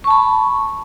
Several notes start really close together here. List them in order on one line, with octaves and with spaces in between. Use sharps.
C#6 A5 B5